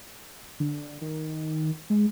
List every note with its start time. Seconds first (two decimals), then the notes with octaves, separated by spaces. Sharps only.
0.60 D3
1.01 D#3
1.90 G#3